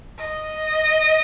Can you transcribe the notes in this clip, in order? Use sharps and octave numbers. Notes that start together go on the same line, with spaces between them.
D#5